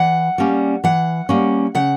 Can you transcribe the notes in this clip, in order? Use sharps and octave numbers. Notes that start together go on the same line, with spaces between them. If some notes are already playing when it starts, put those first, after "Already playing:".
Already playing: E3 F#5
G3 A#3 C#4
E3 F#5
G3 A#3 C#4
C#3 F#5